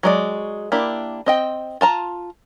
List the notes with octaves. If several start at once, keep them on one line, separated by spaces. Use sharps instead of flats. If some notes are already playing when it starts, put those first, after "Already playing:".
F#3 G#3 D5
A#3 D4 E4 G4
C4 D#5 G5
F4 A5 A#5